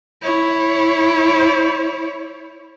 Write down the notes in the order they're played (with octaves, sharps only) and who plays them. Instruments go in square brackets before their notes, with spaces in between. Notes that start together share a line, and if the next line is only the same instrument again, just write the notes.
[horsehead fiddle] E4 C#5